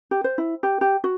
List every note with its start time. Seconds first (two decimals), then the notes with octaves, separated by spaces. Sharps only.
0.11 G4
0.24 C5
0.38 E4
0.63 G4
0.81 G4
1.04 F#4